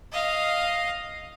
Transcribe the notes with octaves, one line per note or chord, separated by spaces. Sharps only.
D#5 F5